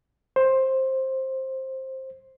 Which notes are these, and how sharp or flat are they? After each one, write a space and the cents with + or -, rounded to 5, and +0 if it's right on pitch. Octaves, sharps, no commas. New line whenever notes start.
C5 +15